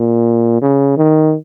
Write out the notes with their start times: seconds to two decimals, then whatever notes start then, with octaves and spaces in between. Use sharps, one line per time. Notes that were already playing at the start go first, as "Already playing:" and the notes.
Already playing: A#2
0.62 C#3
0.97 D#3